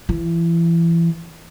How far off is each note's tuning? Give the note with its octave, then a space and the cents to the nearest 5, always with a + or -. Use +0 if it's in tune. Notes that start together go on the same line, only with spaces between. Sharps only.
E3 +30